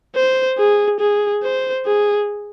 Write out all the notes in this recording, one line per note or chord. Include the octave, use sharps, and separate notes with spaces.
C5
G#4
G#4
C5
G#4